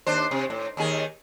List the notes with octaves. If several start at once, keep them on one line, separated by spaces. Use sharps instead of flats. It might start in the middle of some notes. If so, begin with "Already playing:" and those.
D#2 D4 C5
C3
A2
D#2 D#3 G#4